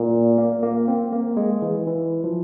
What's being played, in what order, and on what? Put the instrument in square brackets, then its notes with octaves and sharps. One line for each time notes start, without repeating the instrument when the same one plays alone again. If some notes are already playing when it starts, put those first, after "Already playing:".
Already playing: [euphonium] A#2
[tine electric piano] A#3
A#3
C4
A#3
G#3
E3
E3
F3